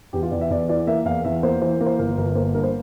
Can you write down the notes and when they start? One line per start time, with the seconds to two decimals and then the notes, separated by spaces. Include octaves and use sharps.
0.13 E2 G4
0.23 F4
0.31 E2 D5
0.41 E5
0.51 E2 D5
0.69 E3 D5
0.87 A#3 E5
1.05 E2 F5
1.25 E2 E5
1.43 A#3 C5
1.61 E3 C5
1.81 A#3
1.86 C5
1.99 G1 A#4
2.17 G1 A#4
2.35 A#3 C5
2.54 G2 A#4
2.63 C5